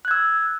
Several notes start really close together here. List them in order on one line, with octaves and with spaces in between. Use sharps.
F#6 G#6 E6